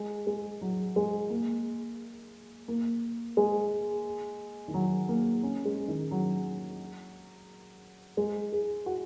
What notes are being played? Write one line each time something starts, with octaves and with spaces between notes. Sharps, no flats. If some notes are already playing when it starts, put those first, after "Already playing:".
Already playing: G#3
G#3
F#3
G#3
A#3
A#3
G#3
D#3
F#3
A#3
C#4
G#3
D#3
F#3
G#3
G#4
F#4